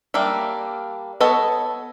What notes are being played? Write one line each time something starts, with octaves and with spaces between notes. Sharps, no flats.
G3 A#3 D4 E5
B3 A4 C#5 D#5